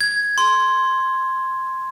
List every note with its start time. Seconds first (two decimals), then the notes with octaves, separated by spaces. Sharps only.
0.01 G#6
0.38 C6